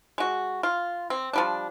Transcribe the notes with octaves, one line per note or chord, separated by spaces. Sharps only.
G#3 F#4
F4
C4
F3 G3 D4